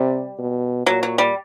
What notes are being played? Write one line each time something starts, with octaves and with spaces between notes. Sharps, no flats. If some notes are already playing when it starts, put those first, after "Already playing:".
Already playing: C3 G3
B2
A#2 F#3
F#3
G3